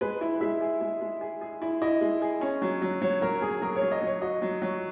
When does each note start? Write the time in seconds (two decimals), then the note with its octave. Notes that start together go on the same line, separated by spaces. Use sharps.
0.01 G#3 B4
0.21 E4
0.41 G#3 E5
0.61 G#4
0.81 G#3
1.01 G#3
1.21 G#4
1.41 G#4
1.62 E4
1.82 E4 D#5
2.01 G#3
2.22 G#4
2.41 C#4
2.62 F#3
2.82 F#3
3.02 F#3 C#5
3.22 F#3 A#4
3.42 F#3 G#4
3.62 F#3 A#4
3.76 C#5
3.82 F#3
3.92 D#5
4.02 F#3
4.07 C#5
4.22 F#4 D#5
4.42 F#3
4.62 F#3